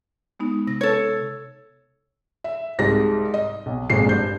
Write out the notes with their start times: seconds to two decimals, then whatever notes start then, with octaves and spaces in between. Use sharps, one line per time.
0.40 G#3 B3 D#4
0.67 C3 A#6
0.81 A4 C#5
2.44 E5
2.79 C2 G#2 G3 A#6
3.34 D#5
3.66 B1
3.90 G#1 F2 A#2 G#3 C7
4.06 G2 C5 G6